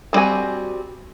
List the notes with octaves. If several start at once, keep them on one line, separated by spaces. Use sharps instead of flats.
E3 G3 C4 F#4 G#5